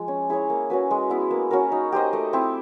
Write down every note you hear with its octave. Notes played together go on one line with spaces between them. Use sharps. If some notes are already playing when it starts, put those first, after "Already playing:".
Already playing: F3 G#3
C#4
E4 G#4 C#5
A#3
C#4 F#4 B4
G#3
B3 E4
A#3
C#4 F#4 A#4
D#4
G4 C5 D#5
A3
C4 E4